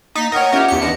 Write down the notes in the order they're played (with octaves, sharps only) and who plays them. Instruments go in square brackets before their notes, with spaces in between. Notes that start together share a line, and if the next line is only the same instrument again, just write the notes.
[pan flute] A#3 [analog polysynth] D#4 A6 B6
[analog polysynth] A#4 [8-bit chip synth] C#5 D#5 [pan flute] F#5 [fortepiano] G5 D#6
[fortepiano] C#4 F4 E5 [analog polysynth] G4 A#4
[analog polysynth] E2 C#7 [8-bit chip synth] G4
[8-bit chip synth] B3 D4 [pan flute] D#5